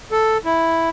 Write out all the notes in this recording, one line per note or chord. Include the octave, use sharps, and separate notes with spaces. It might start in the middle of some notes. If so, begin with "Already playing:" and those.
A4
E4